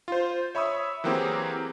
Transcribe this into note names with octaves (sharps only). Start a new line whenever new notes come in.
F4 C5
C#5 E5 B5 C#6 D#6 E6
E3 F#3 A#3 C4 G4 G#4